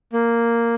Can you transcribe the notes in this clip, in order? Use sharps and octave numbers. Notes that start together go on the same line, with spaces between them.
A#3